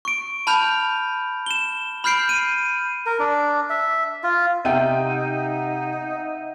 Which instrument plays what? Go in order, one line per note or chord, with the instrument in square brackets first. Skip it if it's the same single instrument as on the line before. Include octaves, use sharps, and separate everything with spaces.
[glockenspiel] C#6 D7
A5 B5 F6 G6 F7
E7 G7
B5 F6 G6 C7 D7
D#7
[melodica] A#4
D4
E5
F4
[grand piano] C3 G4 [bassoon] D#4 [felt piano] E5 G5 [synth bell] F#5 D#7